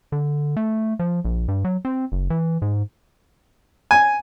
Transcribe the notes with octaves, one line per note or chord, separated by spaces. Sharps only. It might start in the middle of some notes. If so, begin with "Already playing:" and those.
D3
A3
F3
A#1
G2
F#3
C4
F#1
E3
G#2
G#5